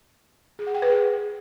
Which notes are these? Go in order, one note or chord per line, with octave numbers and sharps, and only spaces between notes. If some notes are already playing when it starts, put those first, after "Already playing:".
G#4
F#5
G5
B4
G#4